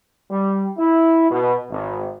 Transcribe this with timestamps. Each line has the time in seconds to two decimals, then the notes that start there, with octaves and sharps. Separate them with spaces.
0.31 G3
0.78 E4
1.31 B2
1.69 G#1